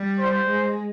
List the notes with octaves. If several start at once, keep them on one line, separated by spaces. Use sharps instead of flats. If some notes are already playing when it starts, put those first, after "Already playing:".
Already playing: G3
C5
G#3